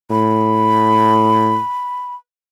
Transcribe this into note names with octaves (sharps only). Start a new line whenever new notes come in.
A2 B5